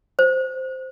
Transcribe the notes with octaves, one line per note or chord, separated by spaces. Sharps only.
C5